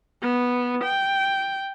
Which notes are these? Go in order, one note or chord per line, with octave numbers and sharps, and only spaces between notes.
B3
G5